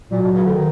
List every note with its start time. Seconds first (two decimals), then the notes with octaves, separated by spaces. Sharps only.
0.10 A#2 F#3
0.21 B2
0.32 C#2 C#3
0.43 D2 D3
0.54 D#3